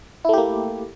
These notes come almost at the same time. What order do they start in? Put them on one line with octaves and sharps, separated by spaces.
E4 A3 G4 A#3